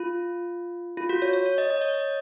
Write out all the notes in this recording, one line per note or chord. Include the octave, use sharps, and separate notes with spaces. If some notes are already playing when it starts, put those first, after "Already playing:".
Already playing: F4
F4
F#4
C#5
C#5
C#5
D#5
D#5
C#5
D#5